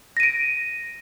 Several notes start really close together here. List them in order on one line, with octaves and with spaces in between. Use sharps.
A#6 D#7 D7